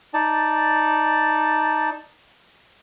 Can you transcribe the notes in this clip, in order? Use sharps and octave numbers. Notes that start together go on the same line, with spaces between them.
D#4 D5 A5